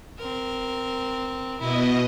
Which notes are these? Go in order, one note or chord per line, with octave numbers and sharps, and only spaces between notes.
C4 A#4
B2 E4 D#5